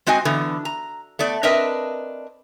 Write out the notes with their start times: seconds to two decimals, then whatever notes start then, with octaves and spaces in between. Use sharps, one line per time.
0.06 G#3 C4 F#4 D#5 G#5
0.25 D3 E3 B3
0.65 A#5
1.19 A3 B3 D5
1.43 C4 D4 A#4 B4 D#5 E5